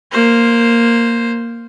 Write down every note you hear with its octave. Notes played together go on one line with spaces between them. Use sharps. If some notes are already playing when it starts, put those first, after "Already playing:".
A#3 C5